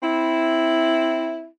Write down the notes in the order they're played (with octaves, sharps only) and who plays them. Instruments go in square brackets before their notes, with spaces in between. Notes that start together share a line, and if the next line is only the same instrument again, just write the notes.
[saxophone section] C4 E4